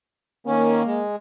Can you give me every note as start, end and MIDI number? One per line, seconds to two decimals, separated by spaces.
0.47 0.83 51
0.47 1.02 58
0.47 0.83 61
0.86 1.16 56